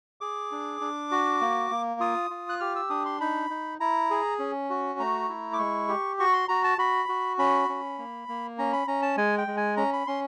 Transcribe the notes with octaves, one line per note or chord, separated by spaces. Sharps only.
G#4 D6
D4
D4
F#4
A#3
A#3
F4 D#6
F4
F#6
G4 F6
E6
D4 D#6
C6
D#4 B5
D#4
E4 A#5
G#4
C#4
F#4
A3 A#5
E4
D6
G#3 C#6
G4
F#4 C#6
C6
F#4 A#5
A5
F#4 B5
F#4
C#4 B5
C#4
A#3
A#3
C#4 A#5
B5
C#4 A#5
A5
G#3 G#5
G5
G#3
G#5
C#4 A#5
B5
C#4 C6